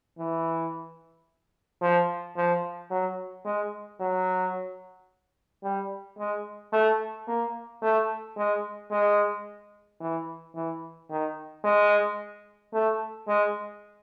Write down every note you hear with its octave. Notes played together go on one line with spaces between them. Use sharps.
E3
F3
F3
F#3
G#3
F#3
G3
G#3
A3
A#3
A3
G#3
G#3
E3
E3
D#3
G#3
A3
G#3